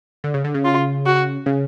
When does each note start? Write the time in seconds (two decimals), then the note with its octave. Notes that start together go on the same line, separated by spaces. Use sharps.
0.24 D3
0.34 C#3
0.44 D3
0.54 C#3
0.65 F4
1.06 F#4
1.46 C#3